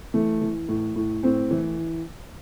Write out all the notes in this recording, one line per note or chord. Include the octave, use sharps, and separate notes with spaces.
E3 A3
E3
A2
A2
A2 C4
E3